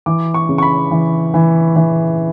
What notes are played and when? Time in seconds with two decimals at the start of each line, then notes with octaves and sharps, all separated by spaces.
0.06 E3 D6
0.34 C#6
0.49 C#3
0.58 C#6
0.62 B5
0.91 E3
1.34 E3
1.76 E3